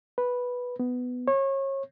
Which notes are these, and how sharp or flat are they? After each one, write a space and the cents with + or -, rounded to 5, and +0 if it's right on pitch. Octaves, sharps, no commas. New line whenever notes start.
B4 -5
B3 +10
C#5 -30